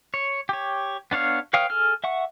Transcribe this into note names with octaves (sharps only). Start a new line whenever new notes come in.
C#5
G4 C#5
B3 D4 C#5 F5
B4 C#5 F5 G5 D#6
G#4 A4 F6
E5 F#5 C#6